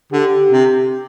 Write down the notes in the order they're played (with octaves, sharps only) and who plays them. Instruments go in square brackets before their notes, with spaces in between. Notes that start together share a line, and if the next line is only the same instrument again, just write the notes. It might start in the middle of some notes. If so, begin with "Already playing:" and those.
[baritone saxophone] D3 [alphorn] G4
[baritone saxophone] C3